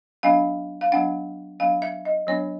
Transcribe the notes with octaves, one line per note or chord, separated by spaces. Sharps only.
F#3 B3 D4 F5
F5
F#3 B3 D4 F#5
F#3 B3 D4 F5
E5
D#5
F#3 B3 D4 C#5